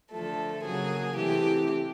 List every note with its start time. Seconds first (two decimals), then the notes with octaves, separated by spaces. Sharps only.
0.12 D3 F3 A3 A4
0.64 C#3 F#3 A#3 G#4
1.16 C3 E3 A3 G4